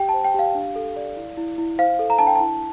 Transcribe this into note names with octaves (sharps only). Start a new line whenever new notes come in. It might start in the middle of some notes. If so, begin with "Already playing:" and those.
Already playing: G4 G5
C5 A5
G5
G4 F5
D4
A4
D5
E4
E4
E4
C5 F5
A4
A#5
D4 A5
G5
A5
E4